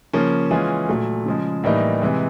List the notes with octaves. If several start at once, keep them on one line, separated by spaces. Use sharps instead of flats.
C#3 F3 A#3 C#4
E3 G#3 C#4 F4 G#4
A#2 F#3 A3
C#3 F3 G#3
A2 E3 G3 A#3 D#4
C3 E3 G#3